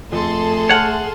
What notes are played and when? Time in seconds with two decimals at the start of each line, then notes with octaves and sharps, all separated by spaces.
0.12 F2 A3 G#4 A4 C6
0.69 C#5 E5 F#5 A5 F6